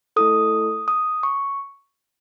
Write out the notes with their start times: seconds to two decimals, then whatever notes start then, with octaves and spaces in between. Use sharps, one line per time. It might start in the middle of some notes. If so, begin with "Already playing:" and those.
0.16 A3 E4 A4 D#6
0.88 D#6
1.23 C#6